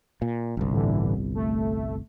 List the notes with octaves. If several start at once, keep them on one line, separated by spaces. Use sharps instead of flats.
A#2
G1 C2
A2 D3 E3
A3